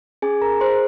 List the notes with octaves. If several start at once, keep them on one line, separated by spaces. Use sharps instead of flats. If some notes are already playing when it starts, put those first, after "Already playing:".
C#4 G#4 G#5
A#4 A#5
G#4 C5 C6